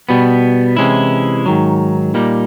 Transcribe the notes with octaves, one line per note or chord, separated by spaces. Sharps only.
B2 G3 B3
C3 E3 G#3 C#4 E4
G#2 D#3 F#3
A#2 G3 A#3 D#4